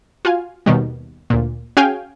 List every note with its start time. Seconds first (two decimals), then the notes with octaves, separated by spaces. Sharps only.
0.25 F4 F#4 F5 G#5
0.66 D#2 B2 D#3 G3
1.30 D2 A#2
1.77 C#4 F#4 G#4 F5 G5 G#5